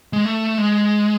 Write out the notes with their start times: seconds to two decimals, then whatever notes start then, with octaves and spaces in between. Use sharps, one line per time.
0.13 G#3
0.25 A3
0.58 G#3